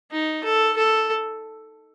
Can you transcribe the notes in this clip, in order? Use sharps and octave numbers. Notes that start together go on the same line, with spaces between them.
D#4
A4
A4